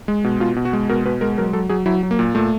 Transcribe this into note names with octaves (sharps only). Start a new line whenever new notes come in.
G#3
B2
B2 F4
B2
F#4
G#3
B2 A#4
B2 B4
G#3 A#4
F#3 A#4
F#3 A4
F#3 G#4
F#3 E4
F#3
A#3
A#2
A#2 A3